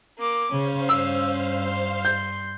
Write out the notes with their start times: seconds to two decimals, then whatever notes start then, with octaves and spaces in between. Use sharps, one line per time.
0.18 A#3 D6
0.51 C#3 C#4 C5 F5
0.89 G2 E6
1.63 C6
2.05 G6